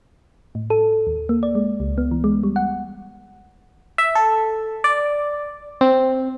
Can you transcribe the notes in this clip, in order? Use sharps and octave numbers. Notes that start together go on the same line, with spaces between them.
A2
A4
D#2
A#3
D5
G#3
C#2
B3
E3
G#3
G3
F#5
E5
A4
D5
C4